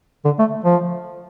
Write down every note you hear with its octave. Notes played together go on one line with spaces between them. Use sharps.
D3
A3
F3